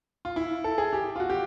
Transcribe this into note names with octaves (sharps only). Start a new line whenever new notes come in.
F4
E4
A4
G#4
G4
F4
F#4
G4